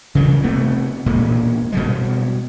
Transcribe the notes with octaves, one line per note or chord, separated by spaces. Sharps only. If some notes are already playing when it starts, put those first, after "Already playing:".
C#3 E3 F3 G3
C3 A3 B3
E1 A#2 G#3
B2 G3 G#3